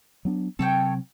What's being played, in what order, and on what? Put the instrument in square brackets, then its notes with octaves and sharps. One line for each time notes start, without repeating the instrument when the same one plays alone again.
[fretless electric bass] F#3 B3 D4
[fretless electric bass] C3 F#3 C4 [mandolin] A4 C#5 G5